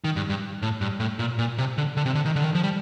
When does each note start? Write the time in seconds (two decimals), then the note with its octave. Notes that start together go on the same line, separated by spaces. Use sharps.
0.04 D#3
0.16 G2
0.29 G2
0.62 A2
0.81 G2
1.00 A2
1.19 A#2
1.39 A#2
1.58 C3
1.78 D3
1.97 D3
2.06 C3
2.15 D3
2.25 D#3
2.36 D3
2.44 D#3
2.55 F3
2.63 G3